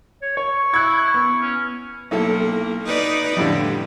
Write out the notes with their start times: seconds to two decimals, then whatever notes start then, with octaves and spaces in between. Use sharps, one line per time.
0.22 C#5
0.37 C#5 C#6
0.74 E4 F#6 G#6
1.14 B3
1.42 C#4
2.11 B1 A#3 E4 A4
2.84 D#4 B4 D5
3.36 F2 A2 D3 G3